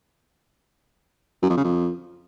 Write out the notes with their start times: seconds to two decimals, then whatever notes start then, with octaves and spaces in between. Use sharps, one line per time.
1.42 F#2
1.50 F2
1.57 C#3
1.64 F2